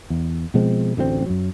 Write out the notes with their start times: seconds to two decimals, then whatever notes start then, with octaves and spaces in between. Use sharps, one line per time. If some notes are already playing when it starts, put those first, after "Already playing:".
0.10 E2
0.54 B2 F3 G#3 C4
0.97 A1 D2 F#3 C4
1.26 F#2 F#3